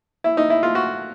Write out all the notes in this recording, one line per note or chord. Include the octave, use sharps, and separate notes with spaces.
E4
D#4
E4
F4
F#4